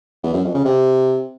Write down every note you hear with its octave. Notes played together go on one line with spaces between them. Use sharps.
E2
F#2
F2
C#3
C3